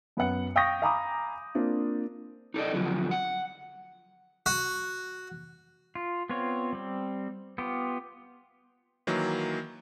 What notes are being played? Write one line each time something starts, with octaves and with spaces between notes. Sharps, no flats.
F#2 B3 B4 F#5 C#7
F5 G5 C#6 D#6 G6 A#6
F5 G#5 A#5 B5 D6 D#6
A#3 C4 D4 F4
D#4 A4 D5 D#5
E2 D3 F3 F#3
F#5
F#4
F4
B3 C4 F4 C#5
G3 C4
B3 F4 G4
D#3 E3 F#3 A#3